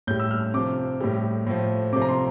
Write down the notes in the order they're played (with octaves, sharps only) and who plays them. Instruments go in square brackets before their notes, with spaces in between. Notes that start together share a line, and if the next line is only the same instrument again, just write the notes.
[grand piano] A2 G3 G6
E6
F6
C3 F3 D6
A2 G3
A2 F3
C3 F3 D6
A#5
C6